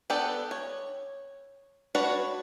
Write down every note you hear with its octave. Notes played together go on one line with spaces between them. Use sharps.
B3 D4 G4 A4 D5
C#5
D4 F#4 B4 C#5 D5